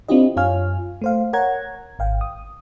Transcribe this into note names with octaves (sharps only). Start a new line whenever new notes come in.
C4 D4 E4 F4 G4 D#5
F#2 F4 C#5 F5 G#5 F6
A3 C5 F5
A#4 C#5 F#5 A#5 G#6
G#1 F5 G5
D#6